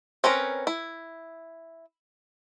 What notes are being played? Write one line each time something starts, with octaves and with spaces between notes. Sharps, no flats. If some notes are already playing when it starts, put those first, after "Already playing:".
C4 C#4 A#4 B4
E4